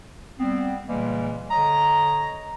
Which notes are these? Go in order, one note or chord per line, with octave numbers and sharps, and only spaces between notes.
G3 B3 C4
A#2 C#3 E3 G3 G#3 A#3
D3 C#5 D#5 A#5